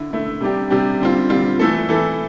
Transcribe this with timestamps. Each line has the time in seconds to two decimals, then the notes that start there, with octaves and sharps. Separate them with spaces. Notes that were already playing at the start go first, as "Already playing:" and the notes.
Already playing: D3 E4
0.11 D3 A3 E4
0.40 C3 G3 D4 G4
0.70 C3 G3 D4 G4
1.00 D3 G3 C4 F4
1.29 D3 G3 C4 F4
1.59 E3 A3 E4 A4
1.89 E3 A3 E4 A4